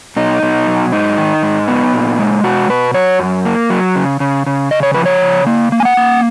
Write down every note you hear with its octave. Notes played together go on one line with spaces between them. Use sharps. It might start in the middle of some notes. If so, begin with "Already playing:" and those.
B2 D#4
B2
F#3
G#2 D#4
D#3
G#2
B3
A#2
G#3
B2 F#4
B2 B4
F#3 C#5
F#2
A#3
F#3
C#3
C#3
C#3
C#3 D#5
C#5
F3 B4
C#5
C#3
A#3
A#3
G#5
F#5
A#3